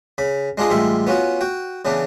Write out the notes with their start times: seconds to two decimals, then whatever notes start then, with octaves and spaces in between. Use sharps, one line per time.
0.18 C#3 B5
0.58 G#3 D4 F4 G#4 D#5
0.70 A1 G3 G#3 F4 E5
1.07 B3 C#4 F4 F#4
1.41 F#4 G5
1.85 C#3 E3 B3 D4